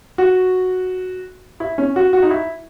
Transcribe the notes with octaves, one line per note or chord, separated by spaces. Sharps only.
F#4
E4
C#4
F#4
F#4
D#4
E4